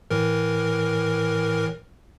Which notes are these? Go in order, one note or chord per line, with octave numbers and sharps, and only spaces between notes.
A2 E3 A#4